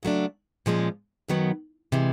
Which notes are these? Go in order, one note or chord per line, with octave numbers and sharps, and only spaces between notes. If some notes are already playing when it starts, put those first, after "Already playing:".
C#3 F#3 A3 D4
A#2 F3 G#3 C#4
F#2 D#3 F#3 B3
C3 E3 G#3